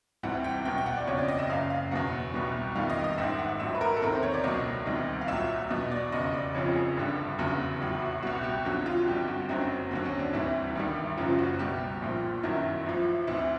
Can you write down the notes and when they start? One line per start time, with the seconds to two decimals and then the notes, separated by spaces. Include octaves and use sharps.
0.23 D2 C3 E3 G3 F#5
0.44 G5
0.65 E2 B2 F#3 G5
0.78 G5
0.86 F#5
0.97 D5
1.07 F#1 F2 C#3 C#5
1.18 D5
1.28 D#5
1.39 E5
1.50 F#1 F#2 C#3 F5
1.70 F5
1.91 E2 B2 F#3 F#5
2.34 C2 B2 G3
2.76 F1 F2 C3 D#3 G3 F5
2.90 D#5
3.04 D#5
3.18 A1 G#2 D#3 E5
3.39 F#5
3.60 A#1 A2 F#3 E5
3.75 B4
3.81 A#4
3.97 A4
4.02 E2 C3 D#3 A#4
4.13 C5
4.23 C#5
4.34 D5
4.44 C#2 B2 F#3 D#5
4.86 D2 C3 D#3 G3
5.21 F5
5.28 C2 A#2 F#3 E5
5.70 E2 B2 F#3 D#5
5.91 D5
6.12 F1 E2 C#3 D#5
6.33 D5
6.54 F1 F2 C#3 F3 C#5
6.75 G#4
6.97 A1 G2 D3 G3
7.38 F1 E2 C#3 F#3
7.80 A1 A2 F#3 G4
8.02 F#4
8.23 C2 B2 G3 F#4
8.44 G4
8.65 F2 D3 F#3 F#4
8.86 F4
9.06 G1 F2 D3 G3 G4
9.28 F#4
9.49 F#1 F#2 D3 F#3 C4
9.91 D#2 D3 F#3 C4
10.05 C#4
10.19 D4
10.33 D2 C3 E3 G3 E4
10.75 A1 G2 D#3 G3
11.17 F#1 F#2 C#3 F3 F4
11.39 F#4
11.59 C2 B2 G3 G4
12.02 A#1 A#2 F3
12.43 G1 F#2 D#3 F#3 E4
12.86 A1 A2 F3
13.27 D2 C3 E3 E4